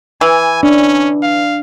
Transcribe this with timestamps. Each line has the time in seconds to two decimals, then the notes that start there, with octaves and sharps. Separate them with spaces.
0.21 E3 G#5
0.63 C#4 D4
1.23 F5